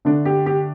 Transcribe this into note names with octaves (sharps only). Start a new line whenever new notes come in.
D3 A3 D4
G4
G4